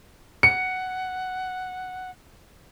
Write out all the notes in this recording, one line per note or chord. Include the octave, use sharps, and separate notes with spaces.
F#5 C#7